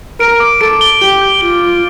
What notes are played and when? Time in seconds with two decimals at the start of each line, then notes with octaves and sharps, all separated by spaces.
0.20 A#4 D7
0.40 D6
0.61 A4 D7
0.81 G7
1.01 G4 G7
1.22 G6
1.41 F4 G7
1.62 D6